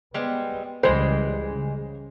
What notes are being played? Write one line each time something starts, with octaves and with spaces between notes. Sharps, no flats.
G3 G#3 B3 C4
C#2 E3 G3 G#3 C5
C#3